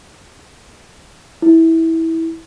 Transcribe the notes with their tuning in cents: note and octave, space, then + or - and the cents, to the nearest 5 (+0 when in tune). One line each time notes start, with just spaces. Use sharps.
E4 -15